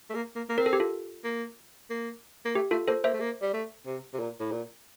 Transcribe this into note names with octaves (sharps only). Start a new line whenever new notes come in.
A3
A#3
A#3
A#3
C4 A#4
A4
G4
F4 A4
A#3
A#3
A#3
A3 G4
A3 F4 A4
A#3 A4 C5
A#3 C5 E5
A3
A#3
G3
A3
C3
C3
A#2
A2
A#2